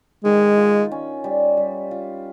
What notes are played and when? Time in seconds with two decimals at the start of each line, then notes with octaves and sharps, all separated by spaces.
0.24 D#3 G#3
0.58 F4
0.91 C#4
1.24 G3
1.57 G3
1.91 F4